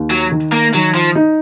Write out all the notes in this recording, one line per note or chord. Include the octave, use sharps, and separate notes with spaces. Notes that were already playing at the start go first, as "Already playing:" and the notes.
Already playing: D#2
F#3
D#3
A#3
D#3 F#3
F3
D#4